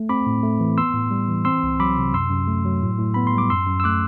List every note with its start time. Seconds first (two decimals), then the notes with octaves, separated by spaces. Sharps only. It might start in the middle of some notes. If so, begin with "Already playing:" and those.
Already playing: A3
0.09 C4 B5 D6
0.27 A2
0.43 A3
0.60 E3
0.78 B3 C6 E6
0.94 A2
1.11 G3
1.28 E3
1.45 C4 C6 E6
1.63 C2
1.80 F#3 B5 D6
1.97 C3
2.14 F#2 C6 E6
2.30 F#2
2.47 A3
2.65 F#3
2.82 A2
2.99 A2
3.14 B3 B5
3.27 C6
3.33 G3 D6
3.50 F#2 C6 E6
3.67 F#2
3.80 E6
3.84 A3 D6 F#6